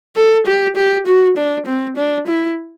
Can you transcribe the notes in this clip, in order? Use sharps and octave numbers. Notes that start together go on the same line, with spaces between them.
A4
G4
G4
F#4
D4
C4
D4
E4